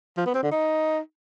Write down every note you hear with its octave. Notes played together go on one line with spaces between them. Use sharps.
F3
B3
C4
D3
D#4